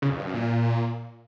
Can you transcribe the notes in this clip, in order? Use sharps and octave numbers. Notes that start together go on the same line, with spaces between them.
C#3
F2
G2
F#2
A#2